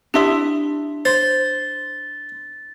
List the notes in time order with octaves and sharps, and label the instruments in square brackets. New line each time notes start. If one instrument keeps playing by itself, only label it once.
[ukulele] D4 E4 E5 [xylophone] G4 C6 D#6
[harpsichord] C5 [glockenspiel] A6